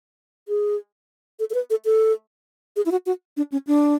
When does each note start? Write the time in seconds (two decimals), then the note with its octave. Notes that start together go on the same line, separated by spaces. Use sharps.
0.48 G#4
1.39 A4
1.50 A4
1.54 B4
1.70 A4
1.85 A4
2.76 G#4
2.86 E4
2.92 F#4
3.06 F#4
3.37 D4
3.52 C#4
3.67 D4